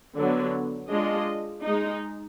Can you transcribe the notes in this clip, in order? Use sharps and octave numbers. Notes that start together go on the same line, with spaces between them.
D3 F#3 B3
G#3 D4 F4 D#5
G#3 D#4